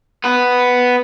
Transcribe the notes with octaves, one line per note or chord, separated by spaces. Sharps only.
B3 B4